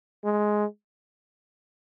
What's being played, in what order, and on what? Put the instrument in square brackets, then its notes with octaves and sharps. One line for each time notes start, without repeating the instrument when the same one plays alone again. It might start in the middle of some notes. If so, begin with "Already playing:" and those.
[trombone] G#3